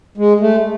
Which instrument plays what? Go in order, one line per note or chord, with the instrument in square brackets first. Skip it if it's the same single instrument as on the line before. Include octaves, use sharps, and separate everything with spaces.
[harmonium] G#3
A3